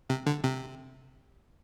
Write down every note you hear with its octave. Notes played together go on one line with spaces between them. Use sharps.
C3
D3
C3